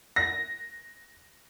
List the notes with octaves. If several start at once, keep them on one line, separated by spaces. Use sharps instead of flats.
A#6